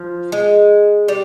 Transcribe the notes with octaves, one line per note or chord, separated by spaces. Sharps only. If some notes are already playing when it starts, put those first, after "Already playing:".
Already playing: F3
G#3
G3